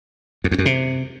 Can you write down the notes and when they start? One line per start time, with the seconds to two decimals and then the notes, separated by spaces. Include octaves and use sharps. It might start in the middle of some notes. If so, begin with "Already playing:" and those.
0.44 F2
0.51 E2
0.58 F#2
0.66 C3